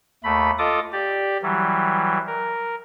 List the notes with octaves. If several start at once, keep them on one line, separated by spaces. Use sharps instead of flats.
D#2 A3 B5
F4 A4 D#5 D6 D#6
G4 D5
E3 F#3 G3
A#4